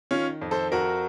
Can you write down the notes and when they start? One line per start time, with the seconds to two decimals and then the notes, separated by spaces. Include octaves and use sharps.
0.11 D#3 C#4 F4
0.42 F2
0.51 A4 C5
0.72 F2 F#4 A#4